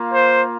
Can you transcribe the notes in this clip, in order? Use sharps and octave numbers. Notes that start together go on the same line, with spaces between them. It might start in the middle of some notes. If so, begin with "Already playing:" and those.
Already playing: A#3 F4
C5